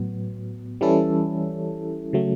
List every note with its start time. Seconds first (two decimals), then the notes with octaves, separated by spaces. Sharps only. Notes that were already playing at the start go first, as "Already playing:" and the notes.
Already playing: A2 F#3 B3
0.81 E3 G3 C#4 E4 A4
2.13 C#3 F#3 A3